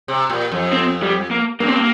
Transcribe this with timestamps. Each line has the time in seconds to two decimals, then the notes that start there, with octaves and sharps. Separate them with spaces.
0.08 C3
0.30 A#2
0.52 F2
0.73 C4
1.03 G3
1.31 A#3
1.60 G2 A#3
1.68 C4
1.76 A#3